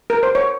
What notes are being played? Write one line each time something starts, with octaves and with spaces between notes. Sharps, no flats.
A#4
C5
C#5